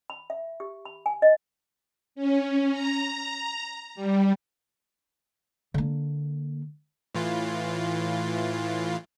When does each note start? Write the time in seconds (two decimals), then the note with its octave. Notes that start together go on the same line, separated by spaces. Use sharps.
0.10 B5
0.30 E5
0.60 G4
0.85 B5
1.06 G#5
1.22 D#5
2.15 C#4
2.71 A#5
3.95 G3
5.74 D3 A#3
7.15 A2 E3 F4